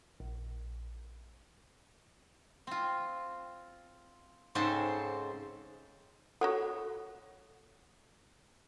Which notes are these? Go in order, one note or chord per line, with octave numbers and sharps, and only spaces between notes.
A#1
C4 F4
G#2 C#3 C4 A4 C5 A5
F#4 A4 C#5 F#5